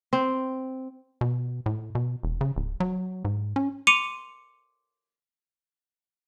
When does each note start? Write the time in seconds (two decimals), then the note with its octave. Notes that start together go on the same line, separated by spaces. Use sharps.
0.13 C4
1.21 B2
1.66 A2
1.95 B2
2.23 E1
2.41 C#3
2.56 D1
2.80 F#3
3.25 G#2
3.56 C#4
3.87 C6 D6 C#7 D#7 F7